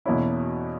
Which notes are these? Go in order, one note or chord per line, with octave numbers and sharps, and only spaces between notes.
E2 B2 A#3 C#4 E4 F#4